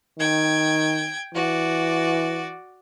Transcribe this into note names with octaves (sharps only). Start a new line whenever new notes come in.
D#3 G5 G#6
E3 F#4 D5